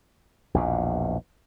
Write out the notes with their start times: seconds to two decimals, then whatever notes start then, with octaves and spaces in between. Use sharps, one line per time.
0.54 A#1 E2 B2